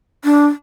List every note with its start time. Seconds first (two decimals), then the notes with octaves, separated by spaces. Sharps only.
0.24 D4